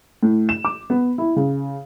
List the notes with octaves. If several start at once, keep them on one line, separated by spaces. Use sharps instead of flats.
A2
E7
D6
B3
E4
C#3